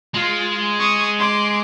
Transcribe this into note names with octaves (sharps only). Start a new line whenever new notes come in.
G#3 F4
C#6 D#6
C6 D6